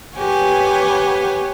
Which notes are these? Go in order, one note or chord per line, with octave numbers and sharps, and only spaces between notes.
G4 B4 C#5 F#5 G#5